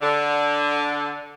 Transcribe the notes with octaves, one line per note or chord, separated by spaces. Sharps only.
D3